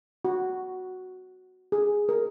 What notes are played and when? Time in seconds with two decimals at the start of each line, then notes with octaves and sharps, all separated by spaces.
0.25 F#4
1.72 G#4
2.09 A#4